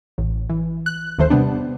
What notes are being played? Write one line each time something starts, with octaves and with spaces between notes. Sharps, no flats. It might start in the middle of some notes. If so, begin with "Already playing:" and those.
A1
E3
F#6
G#1 D#2 D#3 E3 A3 C5
C3 G3 B3 D4